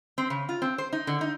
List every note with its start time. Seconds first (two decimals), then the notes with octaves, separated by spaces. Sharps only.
0.18 C4
0.30 C#3
0.49 F4
0.62 C4
0.78 C5
0.93 D#4
1.07 D3
1.21 D#4